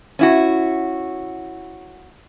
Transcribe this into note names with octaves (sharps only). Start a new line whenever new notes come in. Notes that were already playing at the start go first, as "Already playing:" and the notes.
C#4 E4 F#4